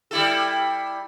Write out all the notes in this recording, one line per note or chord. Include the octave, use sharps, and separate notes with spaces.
G3 E4 A4